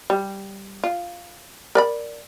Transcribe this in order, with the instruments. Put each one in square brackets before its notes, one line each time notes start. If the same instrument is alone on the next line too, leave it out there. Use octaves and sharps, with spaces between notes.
[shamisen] G3
F4
A#4 D5 B5